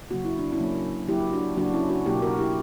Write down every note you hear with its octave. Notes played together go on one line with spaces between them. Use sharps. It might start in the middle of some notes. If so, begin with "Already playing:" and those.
C#3 F#3 A#3 F#4
E4
D4
C#4 E4
C#3 F#3 A#3
C#3 F#3 A#3 E4 G4
D4 F#4
C#3 F#3 A#3 D4 F#4
C#4 E4
D4 F#4
B2 F#3 A#3 E4 G4
F#4 A#4
E4 G4